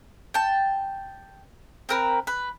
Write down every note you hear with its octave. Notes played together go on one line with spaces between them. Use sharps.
G5 A5
C4 A#4 B4
B4